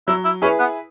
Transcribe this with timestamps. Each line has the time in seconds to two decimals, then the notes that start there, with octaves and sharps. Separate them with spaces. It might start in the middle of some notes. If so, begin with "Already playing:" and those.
0.08 F#3 E4
0.25 E4
0.42 C#4 E4 G#4 B4
0.59 B3